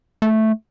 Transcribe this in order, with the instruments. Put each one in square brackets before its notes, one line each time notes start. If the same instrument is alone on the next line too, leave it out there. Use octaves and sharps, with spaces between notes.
[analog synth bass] A3